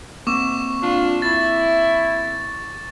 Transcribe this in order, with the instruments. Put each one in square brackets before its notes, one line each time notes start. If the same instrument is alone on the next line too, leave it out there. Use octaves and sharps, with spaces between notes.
[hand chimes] A#3 C4 [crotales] C#6 D6 E7
[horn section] D4 F4
[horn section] E4 [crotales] A6